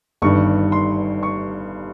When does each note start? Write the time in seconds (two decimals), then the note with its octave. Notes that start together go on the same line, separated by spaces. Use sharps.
0.22 G1 G2 D#3 C#6
0.72 C6
1.23 C#6